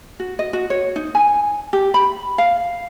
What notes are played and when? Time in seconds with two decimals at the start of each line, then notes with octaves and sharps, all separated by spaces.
0.20 F#4
0.39 D#5
0.53 F#4
0.70 C#5
0.96 D#4
1.15 G#5
1.73 G4
1.94 B5
2.38 F5